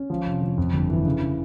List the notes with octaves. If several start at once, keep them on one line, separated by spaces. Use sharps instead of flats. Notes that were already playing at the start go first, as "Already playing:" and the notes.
Already playing: C#4
F3
F1
F3
F2
G1
E3
C#3
C#3